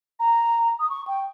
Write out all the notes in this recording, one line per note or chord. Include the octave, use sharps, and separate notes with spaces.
A#5
D#6
C#6
G5